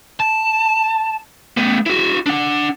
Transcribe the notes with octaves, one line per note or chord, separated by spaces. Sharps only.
A5
A3 B3
E4 F#4
D4 F#5